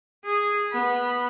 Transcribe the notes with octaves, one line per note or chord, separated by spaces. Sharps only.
G#4
B3 B5